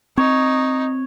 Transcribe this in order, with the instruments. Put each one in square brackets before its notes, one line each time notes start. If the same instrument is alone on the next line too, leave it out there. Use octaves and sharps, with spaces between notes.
[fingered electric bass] C4 [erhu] D#4 [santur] C#5